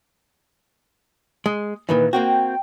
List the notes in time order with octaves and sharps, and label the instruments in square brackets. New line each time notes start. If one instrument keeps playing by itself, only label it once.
[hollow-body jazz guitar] G#3
[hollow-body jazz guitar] A#2 D#3 E3 [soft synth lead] B4
[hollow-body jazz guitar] A#3 C4 F#4 [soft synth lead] G5